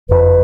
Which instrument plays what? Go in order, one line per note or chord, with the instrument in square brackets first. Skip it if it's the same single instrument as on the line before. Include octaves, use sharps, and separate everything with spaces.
[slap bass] F#1 F2 F3 [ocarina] B4